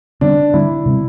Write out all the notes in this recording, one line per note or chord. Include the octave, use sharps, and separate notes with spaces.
D3 G3 C4 D4
D3 G3 C4 E4
C3 G3 C4